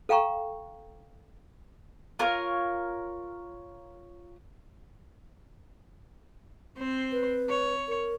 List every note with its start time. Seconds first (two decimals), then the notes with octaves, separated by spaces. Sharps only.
0.09 A4 F5 G5 A#5 C#6
2.19 F4 A#4 C#5
6.78 C4 C5
7.12 B4
7.49 C#5
7.88 A#4